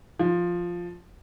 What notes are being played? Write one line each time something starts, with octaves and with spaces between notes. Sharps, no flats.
F3